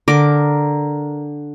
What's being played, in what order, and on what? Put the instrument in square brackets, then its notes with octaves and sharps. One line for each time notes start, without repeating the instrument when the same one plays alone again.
[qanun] D3 A#4 D6